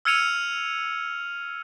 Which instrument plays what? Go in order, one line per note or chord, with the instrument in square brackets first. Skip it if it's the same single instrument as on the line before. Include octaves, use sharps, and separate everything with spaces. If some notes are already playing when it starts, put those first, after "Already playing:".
[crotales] E6 F6 G#6 C#7 D#7 F7